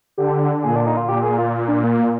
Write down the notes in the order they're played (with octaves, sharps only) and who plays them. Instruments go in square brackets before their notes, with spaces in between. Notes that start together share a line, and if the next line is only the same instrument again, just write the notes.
[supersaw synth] D3 [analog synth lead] G4
[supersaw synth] A#2 [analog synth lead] G#4
[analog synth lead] D4
D#4
F4
[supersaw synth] A#2 [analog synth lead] G4
[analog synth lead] G#4
F4
D4
A#3
A#3